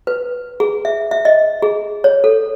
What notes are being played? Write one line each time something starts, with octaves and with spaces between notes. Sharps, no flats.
B4
G#4
E5
E5
D#5
G#4
C#5
A4